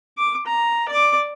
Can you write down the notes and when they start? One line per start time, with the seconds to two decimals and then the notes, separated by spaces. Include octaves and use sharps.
0.18 D6
0.46 A#5
0.88 D5 D6